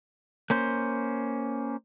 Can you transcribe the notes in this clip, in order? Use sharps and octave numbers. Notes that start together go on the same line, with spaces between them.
A#3 C#4 C5